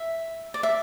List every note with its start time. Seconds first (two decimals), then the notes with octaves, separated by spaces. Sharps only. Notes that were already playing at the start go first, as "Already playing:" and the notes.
Already playing: E5
0.54 D5
0.63 E5